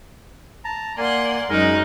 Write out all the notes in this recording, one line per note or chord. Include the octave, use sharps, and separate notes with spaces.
A5 A#5
A#3 D5 F#5 G#5 C6
F#2 G#3 D#4 A#4 F#6